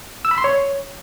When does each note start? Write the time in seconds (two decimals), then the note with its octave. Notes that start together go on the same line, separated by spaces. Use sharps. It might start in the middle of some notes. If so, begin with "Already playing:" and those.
0.25 E6
0.31 B5
0.38 C6
0.44 C#5